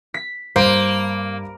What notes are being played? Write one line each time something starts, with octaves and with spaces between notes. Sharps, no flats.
B6
G2 A#3 C5 D7